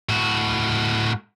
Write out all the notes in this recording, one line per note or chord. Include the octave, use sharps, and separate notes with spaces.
A2 F#4